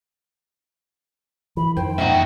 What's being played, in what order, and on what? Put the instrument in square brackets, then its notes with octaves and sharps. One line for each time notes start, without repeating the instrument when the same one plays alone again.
[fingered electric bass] E3 [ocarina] B5
[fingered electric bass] F2 D#3 [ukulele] C5 [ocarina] G5
[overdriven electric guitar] A#2 F#4 [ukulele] D#4 D#5 E5